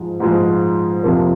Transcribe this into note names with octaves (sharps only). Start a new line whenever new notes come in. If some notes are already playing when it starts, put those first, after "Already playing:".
Already playing: G#2 F3 G#3
G#2 F3 G#3
F2 C3 F3 A#3